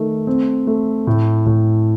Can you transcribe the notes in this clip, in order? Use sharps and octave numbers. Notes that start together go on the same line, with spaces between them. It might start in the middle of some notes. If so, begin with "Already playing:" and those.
Already playing: D#3 A3
C4
A3
A2
A2